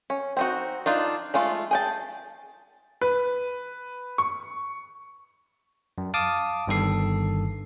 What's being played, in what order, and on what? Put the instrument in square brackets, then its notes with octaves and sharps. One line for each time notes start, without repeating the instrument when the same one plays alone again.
[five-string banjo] C#4
C4 D#4 F#4
D4 D#4 F4
G#3 A3 F4
G#4 G5 A5
[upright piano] B4
C#6
[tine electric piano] F#2
F5 A5 D6 D#6
G1 G2 D#3 A4 C7